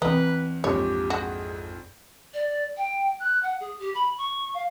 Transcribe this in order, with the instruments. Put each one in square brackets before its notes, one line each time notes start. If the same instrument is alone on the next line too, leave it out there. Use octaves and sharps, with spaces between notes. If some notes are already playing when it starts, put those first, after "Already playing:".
[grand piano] E2 [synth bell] E3 C4 [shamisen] D#4 [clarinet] B4
[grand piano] A#1 F2 G#2 [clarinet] G4 [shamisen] C#5 [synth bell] D#5
[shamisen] F#4 [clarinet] G#4
[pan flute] D5
G5
F#6
F#5
G#4
G4
B5
C#6
F5